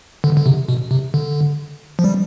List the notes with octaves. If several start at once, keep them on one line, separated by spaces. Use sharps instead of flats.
D3
D3
C3
B2
C3
D3
F3
G3